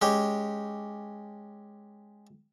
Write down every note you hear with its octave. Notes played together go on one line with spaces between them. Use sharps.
G#3 C#4 G4